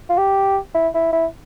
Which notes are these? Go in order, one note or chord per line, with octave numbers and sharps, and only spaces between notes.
F4
G4
E4
E4
E4